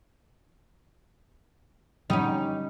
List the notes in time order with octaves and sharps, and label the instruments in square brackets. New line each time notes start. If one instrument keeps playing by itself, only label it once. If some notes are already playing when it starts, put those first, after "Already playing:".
[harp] G3 [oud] C#4 D#4